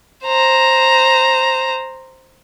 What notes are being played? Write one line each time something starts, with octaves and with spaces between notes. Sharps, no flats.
C5 A#5